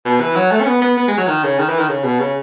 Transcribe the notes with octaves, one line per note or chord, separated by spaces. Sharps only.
B2
E3
F#3
A3
C#4
B3
B3
B3
G#3
F#3
D#3
C#3
D#3
E3
D#3
C#3
B2
C#3